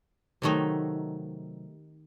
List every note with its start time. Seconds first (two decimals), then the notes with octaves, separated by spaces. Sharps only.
0.42 C3 D#3 F#3 A3 D#4